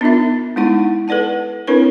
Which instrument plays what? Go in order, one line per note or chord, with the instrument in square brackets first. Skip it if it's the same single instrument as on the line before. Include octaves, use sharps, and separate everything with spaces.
[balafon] B3 D4 D#4 F4 A#4 E5
G#3 B3 D#4 E4 F#5 C#6
A4 B4 D5 F#5 A5
C4 D4 E4 A#4 B4 C#5